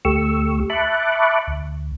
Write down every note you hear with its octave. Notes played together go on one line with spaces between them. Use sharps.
D2 A3 G4 C#6 E6
E5 A5 B5 C#6 D6 F#6
D2